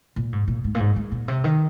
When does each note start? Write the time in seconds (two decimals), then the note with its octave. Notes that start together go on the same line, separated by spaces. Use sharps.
0.16 A#2
0.32 G#2
0.48 A#2
0.64 G#2
0.75 A#2
0.80 G#2
0.96 G#2
1.12 A#2
1.28 C3
1.44 D#3